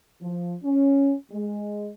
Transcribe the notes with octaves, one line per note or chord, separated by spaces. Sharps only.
F3
C#4
G#3